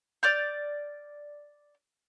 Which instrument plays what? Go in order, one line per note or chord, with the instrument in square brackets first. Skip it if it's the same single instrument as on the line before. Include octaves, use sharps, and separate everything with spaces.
[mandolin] D5 F6 G6